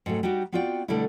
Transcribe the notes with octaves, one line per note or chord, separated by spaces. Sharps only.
G#2 C3 F#3 G3 A3
G3 D#4 F#4 G4
B3 C4 F4 F#4 D5 G5
B2 D3 G3 A3 D4 E4